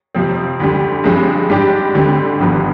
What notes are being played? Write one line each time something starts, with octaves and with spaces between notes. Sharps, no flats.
F2 C3 F3 C4
D2 D3 G3
G2 F3 G#3 C4
G#2 G3 D4 G4
D2 D3 G3 C4
G#1 G2 F3 B3